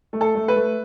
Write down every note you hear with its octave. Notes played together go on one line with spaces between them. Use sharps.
A3
A4
A3
B4
A3